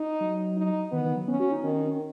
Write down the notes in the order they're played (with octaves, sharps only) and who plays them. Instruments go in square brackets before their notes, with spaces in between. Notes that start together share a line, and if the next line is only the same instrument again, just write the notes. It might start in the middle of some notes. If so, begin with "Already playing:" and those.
Already playing: [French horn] D#4
[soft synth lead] F#3
[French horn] D#4
[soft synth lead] D#3 [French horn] B3
[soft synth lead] D#3
F#3
[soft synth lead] B3 [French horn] C#4
[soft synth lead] F#4
D#4
[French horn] D#3 [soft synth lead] C#4
[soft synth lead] C#4